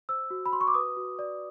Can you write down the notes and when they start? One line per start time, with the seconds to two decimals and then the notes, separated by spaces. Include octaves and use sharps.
0.09 C5 E6
0.30 F#4
0.46 B5
0.53 F#4 C6
0.61 C#6
0.68 D6
0.74 B4 D#6
0.97 F#4
1.19 D5